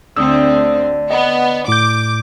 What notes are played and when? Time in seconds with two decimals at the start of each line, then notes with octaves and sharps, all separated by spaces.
0.17 D2 D3 C4 D#6 E6
1.11 B3 D#5
1.68 A2 D6 G6